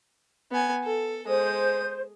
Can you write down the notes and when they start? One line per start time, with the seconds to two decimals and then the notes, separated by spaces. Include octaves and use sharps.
0.52 B3 G#5
0.84 A4
1.27 G#3 C5 D#6